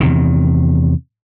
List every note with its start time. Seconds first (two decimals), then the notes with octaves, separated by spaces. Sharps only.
0.01 E2 C3 D#3